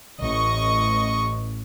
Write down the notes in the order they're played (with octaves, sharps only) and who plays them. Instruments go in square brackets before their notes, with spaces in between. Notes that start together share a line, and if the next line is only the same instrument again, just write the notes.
[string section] A1 D#5 C#6